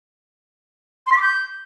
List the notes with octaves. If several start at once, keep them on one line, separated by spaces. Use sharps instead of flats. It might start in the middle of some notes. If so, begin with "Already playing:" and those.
C6
B6
D6
G6